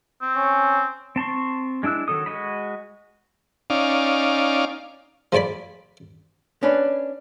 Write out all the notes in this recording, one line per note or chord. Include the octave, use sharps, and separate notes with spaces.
C4
C#4
C4 A5 C6 C#6
G#3 D4 E4 E6 F#6
D#3 F#3 A4 D#6
G#3 F#4 D#5 B5
C#4 D#4 D5 F5
F3 G#3 C#5 D5 B5
C#4 D4 B4